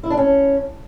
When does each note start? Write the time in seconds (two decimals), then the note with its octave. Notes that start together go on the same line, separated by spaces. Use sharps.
0.03 E4
0.10 D4
0.17 C#4